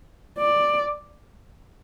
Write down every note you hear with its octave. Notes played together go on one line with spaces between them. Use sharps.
D5